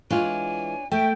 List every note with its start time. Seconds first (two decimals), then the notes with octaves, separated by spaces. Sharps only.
0.10 E3 G#3 D4 F4 C#5 G#5
0.92 A3 E5 G5